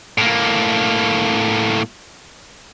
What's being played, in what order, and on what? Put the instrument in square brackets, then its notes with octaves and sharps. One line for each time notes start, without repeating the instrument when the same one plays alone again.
[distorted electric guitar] A2 A#3